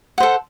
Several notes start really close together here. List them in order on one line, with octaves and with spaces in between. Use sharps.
F#5 C5 A4